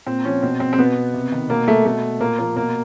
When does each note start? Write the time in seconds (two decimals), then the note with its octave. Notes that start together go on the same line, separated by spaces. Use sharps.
0.07 A#2 C4
0.25 F3 C#4
0.43 B2 C4
0.60 C4
0.73 C4
0.78 B2 B3
1.14 C3
1.32 D#3
1.49 B2 A#3
1.68 A3
1.86 B2 A3
2.20 A#2 A#3
2.38 F3 A#3
2.56 B2 A#3